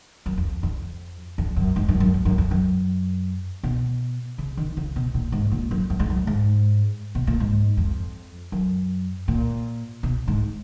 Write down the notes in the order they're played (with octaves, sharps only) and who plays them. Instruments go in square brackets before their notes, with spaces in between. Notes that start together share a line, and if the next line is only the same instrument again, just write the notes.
[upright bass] F#2
F2
F2
F2
F#2
G#2
F#2
F#2
F#2
F#2
F2
F#2
B2
C#3
D#3
C#3
B2
A#2
G#2
A#2
F#2
F#2
G#2
F#2
G#2
B2
A#2
G#2
F2
F#2
A#2
B2
G#2